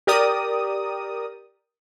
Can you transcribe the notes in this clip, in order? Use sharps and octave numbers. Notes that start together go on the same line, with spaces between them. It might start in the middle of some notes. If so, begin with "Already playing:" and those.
G4 A#4 D5 D#6